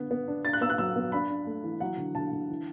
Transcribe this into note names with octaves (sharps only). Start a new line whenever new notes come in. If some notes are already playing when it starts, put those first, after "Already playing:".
Already playing: D3 B3
B3
D4
D4 A6
F#6
B3 E6
F#6
F#3 E6
B3
D4 B5
D4
A3
E3
F#3 F#5
D3
D3 A5
D3
E3